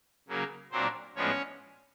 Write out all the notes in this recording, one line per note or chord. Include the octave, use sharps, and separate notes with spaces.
C#3 F#3 A#3
A#2 F#3 A#3 C4 D4 C5
A2 F3 G#3 B3 C#4 D4 C#5